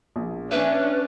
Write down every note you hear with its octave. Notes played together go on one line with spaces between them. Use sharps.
A#1
C#4 D4 B4 E5